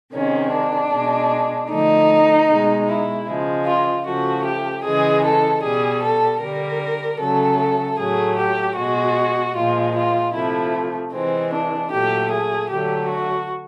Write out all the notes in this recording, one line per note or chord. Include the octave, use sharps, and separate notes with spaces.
C3 D#3 G#3 C#4
D4
B2 G#3
D3 F3 A3 D#4
B2 G#3
E4
C#3 F3 G#3
F4
C#3 F3 A3 F#4
G4
C#3 E3 G#3 G#4
A4
B2 G3 G#4
A4
D3 G3 A#4
C#3 F#3 A3 A4
A2 F#3 A3 G#4
G4
B2 G#3 F#4
A#2 F3 G#3 F4
F4
C3 F3 A3 E4
C3 E3 G#3 C4
D4
A#2 F#3 A3 G4
G#4
D3 F#3 A3 G4
F#4